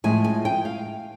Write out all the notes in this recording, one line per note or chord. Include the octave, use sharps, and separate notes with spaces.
A2 F3 G#3 G#5
G#5
G5
F5